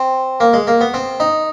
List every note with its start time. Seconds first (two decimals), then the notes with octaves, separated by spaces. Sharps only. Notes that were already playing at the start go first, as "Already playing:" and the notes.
Already playing: C4
0.40 A#3
0.53 G#3
0.67 A#3
0.81 B3
0.94 C4
1.20 D#4